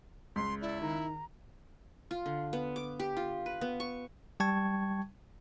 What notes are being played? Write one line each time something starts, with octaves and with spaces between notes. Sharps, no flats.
C#2 C6 B6
E4 D5
D#3 A#5
F4
D3
B3
D6
G4
F4
B4
B3
C#6
G3 G5 A5 C#6 G#6